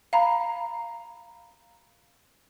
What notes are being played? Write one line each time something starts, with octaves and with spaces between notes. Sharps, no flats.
F5 A#5 B5